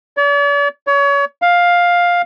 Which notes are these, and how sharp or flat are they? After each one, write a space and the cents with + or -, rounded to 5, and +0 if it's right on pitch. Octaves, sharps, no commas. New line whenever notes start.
D5 -45
C#5 +30
F5 +10